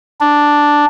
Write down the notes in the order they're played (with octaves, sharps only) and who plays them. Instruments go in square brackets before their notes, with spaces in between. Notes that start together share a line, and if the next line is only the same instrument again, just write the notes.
[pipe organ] D4